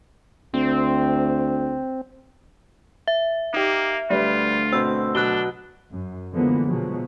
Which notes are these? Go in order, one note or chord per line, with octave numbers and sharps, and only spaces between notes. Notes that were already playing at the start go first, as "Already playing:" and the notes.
D2 C4
E5
A#3 D#4 G4
D2 G3 F4 B4
B2 C4 E6
B2 F#3 D4 F#6 G7
F#2
D3 E3 F3 G#3 A#3 B3
B2 F3 F#3 G#3